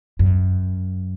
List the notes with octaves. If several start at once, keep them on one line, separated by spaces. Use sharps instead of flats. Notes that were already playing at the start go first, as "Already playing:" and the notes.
F#2